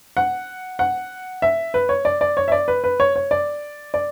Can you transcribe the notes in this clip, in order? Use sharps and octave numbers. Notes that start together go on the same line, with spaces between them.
F#5
F#5
E5
B4
C#5
D5
D5
C#5
E5
D5
B4
B4
C#5
C#5
D5
D5